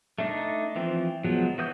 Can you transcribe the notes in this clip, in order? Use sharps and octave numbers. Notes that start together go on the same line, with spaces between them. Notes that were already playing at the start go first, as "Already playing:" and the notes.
A3 D4 D#4
E3 F3 C4
F3 F#3 G#3 B3
E3 F#4 B4 D#6 G6